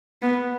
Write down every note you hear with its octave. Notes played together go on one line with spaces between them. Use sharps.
B3